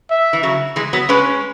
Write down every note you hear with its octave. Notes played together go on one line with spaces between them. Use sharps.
E5
E3
C#3 F#3
E3 G#3
F#3 B3
G#3 C#4 B4